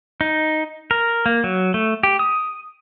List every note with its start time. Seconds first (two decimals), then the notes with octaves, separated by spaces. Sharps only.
0.21 D#4
0.91 A#4
1.26 A#3
1.44 F#3
1.74 A3
2.03 G4
2.19 D#6